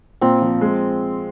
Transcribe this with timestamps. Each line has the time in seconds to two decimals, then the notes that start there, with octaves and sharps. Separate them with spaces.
0.21 A#2 C4
0.42 F3
0.61 G#3